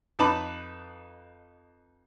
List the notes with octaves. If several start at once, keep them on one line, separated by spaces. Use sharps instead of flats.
F2 D#4 B4 A5 B5 D6